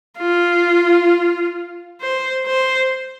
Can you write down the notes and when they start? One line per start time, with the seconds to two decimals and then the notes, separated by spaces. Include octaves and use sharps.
0.17 F4
2.01 C5
2.46 C5